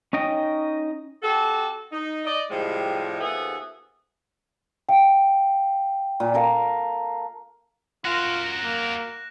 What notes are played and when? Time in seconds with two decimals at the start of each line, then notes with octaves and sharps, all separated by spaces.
0.13 C#4 D#4 D#5 G5
1.23 C4 F#4 G4 A4
1.91 D#4
2.25 D5 D#5
2.49 A2 C3 F3 G3 G#3
3.19 D#2 F3 B3 G#4 A4 E5
4.89 F5 G5
6.20 A#2
6.34 A4 A#4 F5
8.05 F4 F#4 A#4 F#6 A#6 E7
8.64 A#3